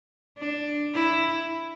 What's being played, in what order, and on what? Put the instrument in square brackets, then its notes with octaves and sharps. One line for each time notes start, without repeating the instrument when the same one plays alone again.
[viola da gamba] D4
E4